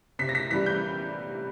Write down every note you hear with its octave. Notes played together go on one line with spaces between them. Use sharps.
C3 B6
A#6
B6
E3 G3 B6
G6